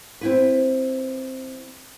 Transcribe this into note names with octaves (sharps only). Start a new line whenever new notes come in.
C4 E4 B4